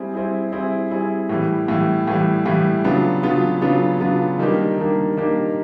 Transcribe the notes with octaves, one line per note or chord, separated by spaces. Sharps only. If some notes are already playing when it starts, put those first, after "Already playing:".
Already playing: G3 C4 E4 G#4
G3 C4 E4 G#4
G3 C4 E4 G#4
G3 C4 E4 G#4
A2 E3 G3
A2 E3 G3
A2 E3 G3
A2 E3 G3
C#3 F#3 B3 D4 F4
C#3 F#3 B3 D4 F4
C#3 F#3 B3 D4 F4
C#3 F#3 B3 D4 F4
D#3 G3 A#3 D4 G4
D#3 G3 A#3 D4 G4
D#3 G3 A#3 D4 G4